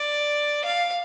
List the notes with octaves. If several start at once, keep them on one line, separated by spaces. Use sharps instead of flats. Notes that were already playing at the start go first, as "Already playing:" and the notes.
Already playing: D5
F5